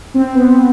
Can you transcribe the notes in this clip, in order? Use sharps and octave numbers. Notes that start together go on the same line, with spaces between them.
C4
B3